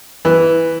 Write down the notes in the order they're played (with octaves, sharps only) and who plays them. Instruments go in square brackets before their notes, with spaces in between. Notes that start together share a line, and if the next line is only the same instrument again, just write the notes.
[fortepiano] E3